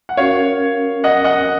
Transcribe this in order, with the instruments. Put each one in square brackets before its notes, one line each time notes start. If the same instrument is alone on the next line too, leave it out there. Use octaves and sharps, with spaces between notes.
[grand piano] F#5
[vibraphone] C#4 F#4 A#4 [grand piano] C#5 F5
[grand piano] D#5 F#5
D#5 F#5